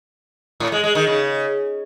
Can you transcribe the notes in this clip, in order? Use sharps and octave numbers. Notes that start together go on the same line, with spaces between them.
A2
G#3
G#3
D#3
C#3